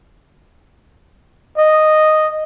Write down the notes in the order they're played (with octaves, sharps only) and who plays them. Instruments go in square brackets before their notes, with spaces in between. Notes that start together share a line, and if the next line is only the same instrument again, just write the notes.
[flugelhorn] D#5